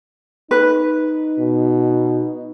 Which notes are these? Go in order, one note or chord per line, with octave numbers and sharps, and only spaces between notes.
D#4 B4
B2